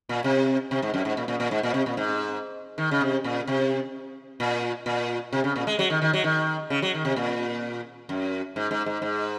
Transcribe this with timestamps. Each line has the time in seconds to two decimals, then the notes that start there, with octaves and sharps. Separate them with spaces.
0.09 A#2
0.24 C3
0.71 C3
0.82 G#2
0.94 F#2
1.05 G#2
1.17 A#2
1.28 A#2
1.40 A#2
1.51 G#2
1.63 A#2
1.74 C3
1.86 A#2
1.97 G#2
2.78 D#3
2.91 C#3
3.01 C3
3.24 A#2
3.47 C3
4.40 A#2
4.86 A#2
5.32 C3
5.44 C#3
5.56 A#2
5.67 G#3
5.79 F#3
5.90 D#3
6.02 D#3
6.13 F#3
6.24 D#3
6.70 C#3
6.82 F#3
6.94 D#3
7.05 C3
7.16 A#2
8.09 F#2
8.56 G#2
8.71 G#2
8.86 G#2
9.02 G#2